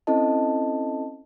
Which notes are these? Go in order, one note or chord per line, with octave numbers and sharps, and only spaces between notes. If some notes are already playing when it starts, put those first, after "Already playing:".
C4 C#4 E4 A4 D#5 A5